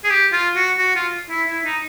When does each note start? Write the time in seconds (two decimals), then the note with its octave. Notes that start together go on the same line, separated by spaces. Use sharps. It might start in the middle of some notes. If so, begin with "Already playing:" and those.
0.04 G#4
0.10 G4
0.32 F4
0.56 F#4
0.79 F#4
0.95 F4
1.30 E4
1.48 E4
1.64 D#4